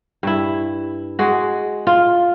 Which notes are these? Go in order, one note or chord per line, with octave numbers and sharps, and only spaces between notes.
G2 E4
G#3 F#4
F4